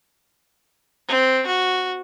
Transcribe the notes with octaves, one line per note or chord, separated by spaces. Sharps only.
C4
F#4